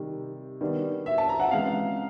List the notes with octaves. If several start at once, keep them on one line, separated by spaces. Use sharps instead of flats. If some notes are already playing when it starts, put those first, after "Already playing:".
Already playing: C3 D#3 G3
D#3 G3 B3 D4
E5
A5
A#5
F#5
C#3 E3 G#3 C4 F5